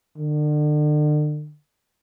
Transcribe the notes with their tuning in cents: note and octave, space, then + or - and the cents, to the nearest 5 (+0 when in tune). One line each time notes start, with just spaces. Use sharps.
D3 +35